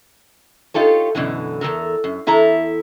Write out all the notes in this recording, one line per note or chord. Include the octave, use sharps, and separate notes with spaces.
D#4 F4 G4 A4 C#5
F#2 B2 D3 E3
E2 G3 A4 A#4
F#2
E2 E4 A4 A#5